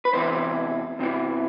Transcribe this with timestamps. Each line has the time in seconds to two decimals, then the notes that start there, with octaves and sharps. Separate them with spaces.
0.05 B4
0.13 E2 C3 E3 C5
0.99 E2 C3 E3